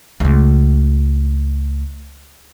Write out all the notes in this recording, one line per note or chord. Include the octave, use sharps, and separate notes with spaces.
C#2 A3